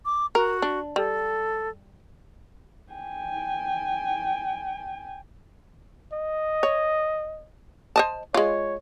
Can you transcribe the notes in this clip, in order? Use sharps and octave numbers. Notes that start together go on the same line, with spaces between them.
D6
F#4 A#4
D4
G3 A4
G5 G#5
D#5
C#5
C5 D#5 A5
G#3 F4 C#5